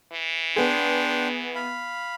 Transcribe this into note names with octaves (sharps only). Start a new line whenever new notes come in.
E3
B3 D4 G#4 G5 C6
F5 B5